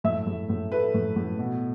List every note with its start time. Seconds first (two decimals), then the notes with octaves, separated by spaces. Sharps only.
0.04 A2 E5
0.27 A2
0.49 A2
0.72 A3 B4
0.94 A2
1.16 A2
1.38 B2